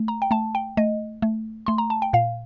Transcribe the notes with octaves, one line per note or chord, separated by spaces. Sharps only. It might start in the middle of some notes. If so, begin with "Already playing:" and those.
Already playing: A3
A#5
G5
A3 A5
G5
A3 D#5
A3
A3 C6
A#5
A5
G5
A#2 F5